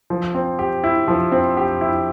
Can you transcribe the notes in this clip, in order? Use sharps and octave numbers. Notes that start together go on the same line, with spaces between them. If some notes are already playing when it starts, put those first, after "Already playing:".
F3
C4
G4
E4
F3
C4
G4
E4